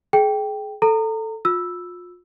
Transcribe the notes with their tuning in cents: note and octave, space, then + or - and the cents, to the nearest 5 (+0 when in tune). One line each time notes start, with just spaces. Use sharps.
G#4 +30 G5 +0
A4 +0 A#5 -30
F4 +35 E6 +0